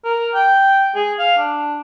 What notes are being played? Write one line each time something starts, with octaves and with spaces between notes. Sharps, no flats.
A#4
G5
G#4
F5
D4